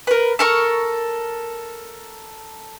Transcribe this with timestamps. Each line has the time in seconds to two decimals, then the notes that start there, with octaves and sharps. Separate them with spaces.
0.07 A#4 B4
0.39 A4 A#4 C#6